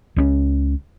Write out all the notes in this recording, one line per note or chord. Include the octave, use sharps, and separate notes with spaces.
C#2 A3 C#4